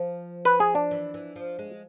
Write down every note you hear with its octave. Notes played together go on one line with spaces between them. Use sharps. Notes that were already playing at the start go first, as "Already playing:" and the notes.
Already playing: F3
B4
G#4
D4
E3
E3
F3
G#3